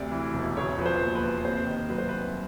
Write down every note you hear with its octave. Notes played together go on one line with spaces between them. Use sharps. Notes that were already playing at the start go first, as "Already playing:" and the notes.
Already playing: D2 C3 D5
E3
E1
C#3 C#5
F3 B4
C5
D#2
B4
D#2
C3 C5
D#3
F#3 B4
C5
C2 B4